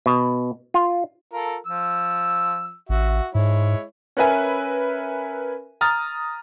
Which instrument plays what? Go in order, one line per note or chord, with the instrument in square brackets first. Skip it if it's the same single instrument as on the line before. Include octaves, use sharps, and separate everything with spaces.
[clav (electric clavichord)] B2
F4
[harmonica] F4 A4 A#4
F3 E6
[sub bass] A1 [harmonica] F#4 E5
[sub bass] G#2 [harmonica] G#3 E4 C#5
[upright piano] C#4 A#4 B4 E5 G#5
A#5 D#6 F6 A6